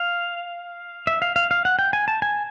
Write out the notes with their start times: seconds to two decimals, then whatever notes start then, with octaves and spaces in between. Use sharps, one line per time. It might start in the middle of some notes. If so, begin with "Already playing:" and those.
Already playing: F5
1.07 E5
1.22 F5
1.36 F5
1.51 F5
1.65 F#5
1.79 G5
1.93 G#5
2.08 A5
2.22 G#5